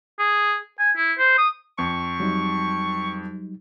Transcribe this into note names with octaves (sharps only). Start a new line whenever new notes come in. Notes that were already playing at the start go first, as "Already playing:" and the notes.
G#4
G#5
E4
C5
D#6
F2 C#6
F#3 G3 D#4